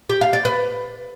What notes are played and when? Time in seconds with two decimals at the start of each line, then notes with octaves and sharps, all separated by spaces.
0.09 G4
0.21 F5
0.33 D5
0.45 B4